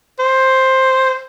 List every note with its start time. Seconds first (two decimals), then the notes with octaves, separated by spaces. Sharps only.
0.19 C5